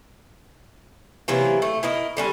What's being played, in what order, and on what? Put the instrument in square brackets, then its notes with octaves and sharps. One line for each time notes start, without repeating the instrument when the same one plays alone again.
[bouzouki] C3 E3 F#3 A#3
A3
E4 A#4 D#5
D3 G3 C#4